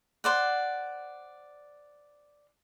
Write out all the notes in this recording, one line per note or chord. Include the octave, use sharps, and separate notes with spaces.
C5 D5 F#5